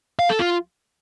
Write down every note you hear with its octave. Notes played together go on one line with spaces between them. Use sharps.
F5
A4
F4